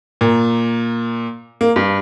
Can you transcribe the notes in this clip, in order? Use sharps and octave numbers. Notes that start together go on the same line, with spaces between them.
A#2
A#3
G2